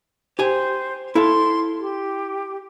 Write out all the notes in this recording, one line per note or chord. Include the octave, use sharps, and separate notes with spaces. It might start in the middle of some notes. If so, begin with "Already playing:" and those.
G4 C5 G#5
E4 A4 F5 C6
G4